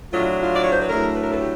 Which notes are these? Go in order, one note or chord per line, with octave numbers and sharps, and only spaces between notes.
A2 F#3 A3 D4 F4
F4
D5
C#5
C5
B4
A2 F#3 A3 D4 G#4 A#4
B4
A#4
A4 B4
G4